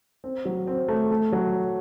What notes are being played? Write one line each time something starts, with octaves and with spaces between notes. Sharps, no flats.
C4
F#3
C4
A3
A3
F#3